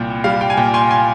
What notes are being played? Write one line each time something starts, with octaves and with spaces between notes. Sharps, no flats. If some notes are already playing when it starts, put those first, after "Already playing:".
Already playing: C2 A#2 G5
G3 F5
G5
G#5
A#2 G5
G#5 C6
G#5 C6